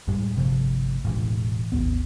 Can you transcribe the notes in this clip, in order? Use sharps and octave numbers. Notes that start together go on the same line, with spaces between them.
F#2 A2 G3 G#3
G1 C3 F3 A3
E1 A2 E3 G#3
G#1 D#2 B3